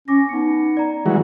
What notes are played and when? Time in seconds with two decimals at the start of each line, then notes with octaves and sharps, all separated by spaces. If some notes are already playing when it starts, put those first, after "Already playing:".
0.08 C#4 D6 A#6
0.29 B3 D#4 C#7
0.77 D5 A#5
1.06 E3 G3 G#3 F#4